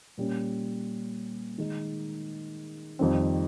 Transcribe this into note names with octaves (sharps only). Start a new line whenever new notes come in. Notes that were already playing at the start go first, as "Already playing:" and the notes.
A#2 G3 C#4
D#3 G#3 D#4
F2 D#3 G3 C4